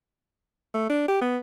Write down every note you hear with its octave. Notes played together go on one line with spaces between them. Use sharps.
A3
D4
G4
B3